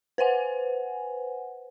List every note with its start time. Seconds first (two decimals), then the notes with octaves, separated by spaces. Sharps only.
0.18 B4 C5 F#5 G#5